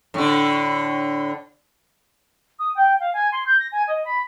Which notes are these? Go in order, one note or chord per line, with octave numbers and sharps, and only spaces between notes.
A2 D3
D#6
G5
F5
G#5
C6
G6
A#6
G#5
D#5
B5